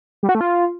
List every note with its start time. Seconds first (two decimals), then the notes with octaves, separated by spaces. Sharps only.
0.23 G3
0.29 F#4
0.35 A3
0.41 F4